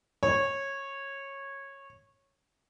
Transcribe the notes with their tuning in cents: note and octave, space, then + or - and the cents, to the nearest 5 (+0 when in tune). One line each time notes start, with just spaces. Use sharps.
C#5 -15